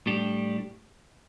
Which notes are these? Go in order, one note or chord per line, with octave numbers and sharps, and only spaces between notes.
A2 G3 D4 G4